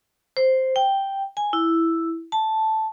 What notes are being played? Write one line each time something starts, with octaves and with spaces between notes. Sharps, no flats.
C5
G5
G#5
E4
A5